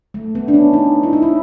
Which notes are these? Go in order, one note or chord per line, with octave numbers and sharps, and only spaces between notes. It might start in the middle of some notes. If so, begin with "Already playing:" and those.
A3
B3
D4
C#4
D#4
E4
D#4
E4